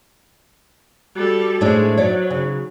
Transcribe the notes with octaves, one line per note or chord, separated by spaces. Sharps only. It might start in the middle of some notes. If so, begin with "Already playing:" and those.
G3 F#4 A4
A2 G#3 A3 D4 D#4 C5
F#3 C#5 D5
C#3